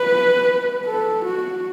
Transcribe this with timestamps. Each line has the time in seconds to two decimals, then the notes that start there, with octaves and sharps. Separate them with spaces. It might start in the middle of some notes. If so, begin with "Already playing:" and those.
Already playing: B4
0.86 A4
1.25 F#4